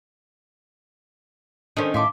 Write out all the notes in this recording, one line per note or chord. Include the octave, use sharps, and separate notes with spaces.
D#3 C#4 D4 A4 C5
A2 E5 F5 A5 C6 D6